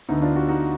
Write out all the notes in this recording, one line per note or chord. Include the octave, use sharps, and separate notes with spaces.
D2 D3 B3 D#4
D4 F4
D#4 F#4
D#4 F#4